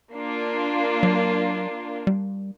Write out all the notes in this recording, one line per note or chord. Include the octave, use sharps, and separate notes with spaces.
A#3 D4 F4
F#3
G3